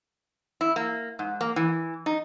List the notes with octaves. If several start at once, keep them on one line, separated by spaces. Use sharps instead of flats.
E4
A#3
G#2
A#3
E3
D#4